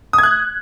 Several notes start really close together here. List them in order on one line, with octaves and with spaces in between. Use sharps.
D#6 G#6 F#6